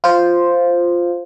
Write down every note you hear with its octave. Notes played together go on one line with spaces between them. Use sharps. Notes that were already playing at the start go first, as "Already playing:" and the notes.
F4 C5